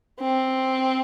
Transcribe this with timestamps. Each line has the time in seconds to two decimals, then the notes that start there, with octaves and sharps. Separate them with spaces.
0.20 C4